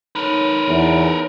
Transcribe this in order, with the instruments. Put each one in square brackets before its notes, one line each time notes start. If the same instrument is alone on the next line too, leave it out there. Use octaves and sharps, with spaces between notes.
[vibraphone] D#4 C#5 [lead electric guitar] A#4 B4
[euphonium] E2